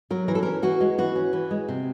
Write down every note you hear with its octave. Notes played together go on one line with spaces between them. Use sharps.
F#3 A#4
E3 A#4
A4
C#4 A#4
E3 F#4
G#3
E3 F#4
C#4
E3
G#3
C3